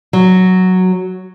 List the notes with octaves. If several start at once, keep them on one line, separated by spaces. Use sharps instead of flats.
F#3